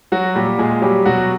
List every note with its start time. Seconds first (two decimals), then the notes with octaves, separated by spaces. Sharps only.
0.12 F#3 F#4
0.35 A#2 G3 G4
0.58 A#2 G#3 G#4
0.82 F#3 G3 G4
1.05 B2 F#3 F#4